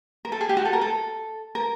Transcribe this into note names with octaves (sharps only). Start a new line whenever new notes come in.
A#4
A4
G#4
G4
F#4
A4
A#4
A4
A#4